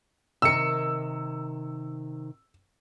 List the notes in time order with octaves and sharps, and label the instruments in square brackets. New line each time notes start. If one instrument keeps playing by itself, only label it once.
[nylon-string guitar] C3 D#3 A#4 [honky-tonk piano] E6 C#7